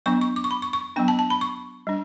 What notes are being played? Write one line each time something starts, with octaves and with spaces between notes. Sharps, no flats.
F#3 B3 D4 C#6
C#6
D6
C#6
B5
C#6
C#6
F#3 B3 D4 G5
A5
A5
B5
C#6
G3 D4